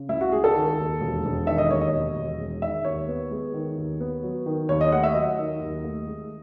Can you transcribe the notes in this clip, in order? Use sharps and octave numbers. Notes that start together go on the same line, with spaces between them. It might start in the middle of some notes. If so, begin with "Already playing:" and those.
Already playing: C#3
C#2 E4
F#4
G#3 G#4
A4
D#3
D#2
E1
E1
D#3 E5
D#5
D#2 C#5
D#5
E1
E1
G#3
D#3 E5
D#2 C#5
B3
G#3
D#3
D#2
B3
F#3
D#3
D#2 C#5
D#5
A3 F#5
E5
F#3 D#5
D#3
D#2
A3
G#3